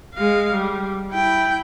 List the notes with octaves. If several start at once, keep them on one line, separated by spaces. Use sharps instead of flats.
G#3 F5
G3
E4 G5